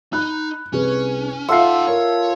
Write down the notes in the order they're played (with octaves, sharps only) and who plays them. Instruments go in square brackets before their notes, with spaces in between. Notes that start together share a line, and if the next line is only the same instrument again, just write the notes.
[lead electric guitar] D#4 [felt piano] B5 F#6
[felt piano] C2 G#4 B4 [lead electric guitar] C#4
[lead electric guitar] D#4 F#5 [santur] F4 A4 E5 [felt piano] C6 C7
[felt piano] A#4 [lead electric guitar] C#5